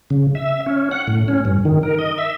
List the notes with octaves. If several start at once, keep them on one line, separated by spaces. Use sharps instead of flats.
C#3
E5
C#4
F#5
A2
C#4
G2
D#3
A#4
D#5
E5